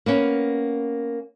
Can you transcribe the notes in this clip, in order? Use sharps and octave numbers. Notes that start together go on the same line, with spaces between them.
A#3 B3 C#4